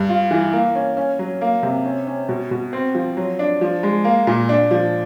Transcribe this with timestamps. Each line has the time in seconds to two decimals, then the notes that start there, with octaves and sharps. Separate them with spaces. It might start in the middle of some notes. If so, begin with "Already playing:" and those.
Already playing: G2
0.09 F4
0.31 E3
0.53 A#3
0.75 C#4
0.97 C#4
1.19 F#3
1.41 A#3
1.63 C3
1.85 C#4
2.07 C#4
2.29 B2
2.51 B2
2.73 C4
2.95 F3
3.17 F#3
3.39 D4
3.61 F3
3.83 G#3
4.04 A#3
4.27 A#2
4.49 D4
4.71 F3